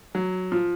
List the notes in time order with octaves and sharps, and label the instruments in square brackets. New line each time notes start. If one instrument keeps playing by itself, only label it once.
[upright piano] F#3
F3